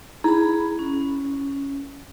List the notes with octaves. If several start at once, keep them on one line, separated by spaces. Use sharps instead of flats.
E4 G#4 A#5 B5
C#4